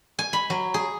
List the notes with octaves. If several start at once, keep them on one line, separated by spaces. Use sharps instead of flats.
G#5
B5
F#3
G#4